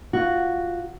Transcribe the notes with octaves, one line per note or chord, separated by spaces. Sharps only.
F4 F#4